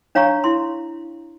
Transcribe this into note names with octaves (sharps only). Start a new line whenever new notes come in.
D4 C#5 F5 A#5 C#6
E4 C6